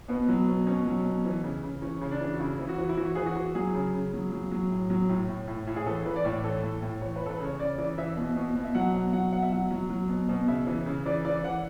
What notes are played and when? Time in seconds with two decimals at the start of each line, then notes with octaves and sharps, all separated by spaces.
0.08 B2 B3
0.28 F#3
0.48 B2
0.66 B2 C#4
0.86 F#3
1.05 B2
1.25 E3
1.44 C#3
1.63 C#3
1.82 E3 C#4
2.01 C#3
2.11 D4
2.21 E3
2.33 F#4
2.40 C#3 E4
2.59 E3
2.69 F#4
2.78 E3
2.89 E4
2.97 E3 F#4
3.15 E3 G#4
3.26 F#4
3.36 E3
3.55 F#3 G#4
3.74 C#3
3.93 C#3
4.13 F#3
4.32 F#3
4.51 F#3
4.71 A2
4.90 F#3
5.09 A2
5.29 A2
5.47 A2
5.67 A2
5.76 G#4
5.86 E3 A4
6.05 E3 B4
6.16 D5
6.25 A2 C#5
6.44 E3 A4
6.63 A2
6.82 A2
7.01 E3 C#5
7.16 E3 B4
7.26 A4
7.30 B4
7.40 C#3 C#5
7.59 C#3 D5
7.78 E3 D5
7.98 E3 E5
8.17 B2
8.36 B2
8.56 B2
8.64 E5
8.75 F#3 F#5
8.94 B2
9.13 F#3 F#5
9.32 B2 F#5
9.42 E5
9.52 F#3 F#5
9.71 F#3
9.90 F#3
10.09 B2
10.29 B2
10.47 C#3 E5
10.67 E3
10.86 C#3
11.06 E3 D5
11.25 E3 D5
11.44 E3 F#5